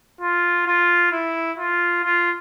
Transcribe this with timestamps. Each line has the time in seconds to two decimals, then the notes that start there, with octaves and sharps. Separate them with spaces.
0.21 F4
0.66 F4
1.12 E4
1.58 F4
2.04 F4